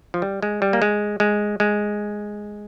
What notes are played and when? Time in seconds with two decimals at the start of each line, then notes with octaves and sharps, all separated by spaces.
0.14 F3
0.22 G3
0.43 G#3
0.62 G3
0.73 A#3
0.82 G#3
1.20 G#3
1.60 G#3